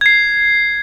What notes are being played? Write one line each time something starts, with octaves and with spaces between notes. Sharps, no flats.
G#6 C7